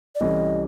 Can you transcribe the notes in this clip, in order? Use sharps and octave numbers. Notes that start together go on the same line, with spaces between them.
D5
C2 C3 E3 A3 C#4 D#5